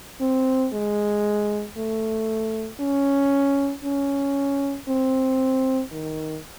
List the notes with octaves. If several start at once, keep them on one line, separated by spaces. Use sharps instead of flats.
C4
G#3
A3
C#4
C#4
C4
D#3